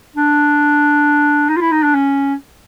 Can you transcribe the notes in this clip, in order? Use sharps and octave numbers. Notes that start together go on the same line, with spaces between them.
D4
D#4
F4
E4
D#4
D4
C#4